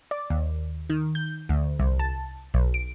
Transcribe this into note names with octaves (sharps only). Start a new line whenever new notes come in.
D5
D#2
D#3
G6
D2
C2
A5
B1
D7